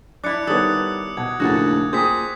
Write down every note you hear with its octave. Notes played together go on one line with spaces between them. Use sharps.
D4 E4 D6 F#6 C#7
D#3 G3 B3 A4 C#5 D6 D#6 F#6
B2 G#6
A#1 D#2 A2 C#3 F#4 A4 F#6
A#2 C4 G#4 D#6 G6 B6